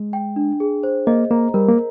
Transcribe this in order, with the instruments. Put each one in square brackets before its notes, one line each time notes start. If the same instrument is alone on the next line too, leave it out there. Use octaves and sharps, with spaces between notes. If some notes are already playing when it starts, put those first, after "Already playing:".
Already playing: [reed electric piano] G#3
[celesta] G5
D4
G#4
C5
[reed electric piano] A#3 [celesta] D#5
[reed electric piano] A#3 [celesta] A#5
[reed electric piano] G3 [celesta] A#4
[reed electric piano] A#3